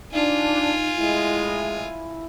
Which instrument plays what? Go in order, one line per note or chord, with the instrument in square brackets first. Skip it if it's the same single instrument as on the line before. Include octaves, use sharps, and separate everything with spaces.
[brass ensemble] D4 [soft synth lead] D#4 [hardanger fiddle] F4 G#5
[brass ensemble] A2 G#3 [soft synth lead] E4